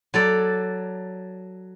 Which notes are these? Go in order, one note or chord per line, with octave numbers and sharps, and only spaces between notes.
F#3 A4 D5